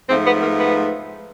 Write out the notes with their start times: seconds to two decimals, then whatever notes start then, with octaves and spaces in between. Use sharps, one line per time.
0.08 G#2 F3 A3 C4
0.26 B3
0.42 A#3
0.58 B3